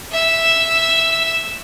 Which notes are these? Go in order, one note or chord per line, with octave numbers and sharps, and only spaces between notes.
E5 E6